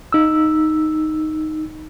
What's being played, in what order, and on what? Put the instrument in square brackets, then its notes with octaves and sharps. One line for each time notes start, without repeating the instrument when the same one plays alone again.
[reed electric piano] D#4 E6